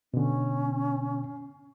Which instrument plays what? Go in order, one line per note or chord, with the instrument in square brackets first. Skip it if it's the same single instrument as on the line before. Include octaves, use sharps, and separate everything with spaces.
[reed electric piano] B2 D3 [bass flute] C#4